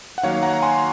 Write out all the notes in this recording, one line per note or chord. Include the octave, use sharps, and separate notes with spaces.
F#5
D#3 F#3 A#3 C#5 F5
F#5 A#5
A#5
G#5 C6